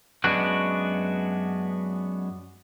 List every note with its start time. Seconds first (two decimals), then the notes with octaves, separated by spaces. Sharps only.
0.24 F#2 G#3 B3 D4 F#4